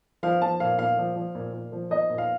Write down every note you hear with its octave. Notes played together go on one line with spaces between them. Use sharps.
F3 F5
F3 A5
A#2 F5
A#2 F5
F3
F3
A#2
A#2
F3
F3 D#5
A#2
F5